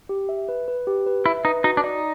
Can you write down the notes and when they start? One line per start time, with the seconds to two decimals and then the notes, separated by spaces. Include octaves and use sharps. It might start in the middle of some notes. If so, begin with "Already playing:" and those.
0.09 G4
0.29 E5
0.49 B4
0.68 B4
0.87 G4
1.06 B4
1.25 E4 E5
1.45 D#4 B4
1.64 D#4 F#4
1.77 D4
1.84 D#4 D5